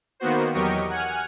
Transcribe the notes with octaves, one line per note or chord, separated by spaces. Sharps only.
D#3 A#3 B3 F#4 C5
E2 F#3 G4 A#4 D#5 C#6
F#5 G#5 F6 G#6